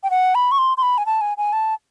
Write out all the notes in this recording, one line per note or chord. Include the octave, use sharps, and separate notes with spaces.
G5
F#5
B5
C#6
C6
C6
B5
G#5
A5
G#5
G#5
A5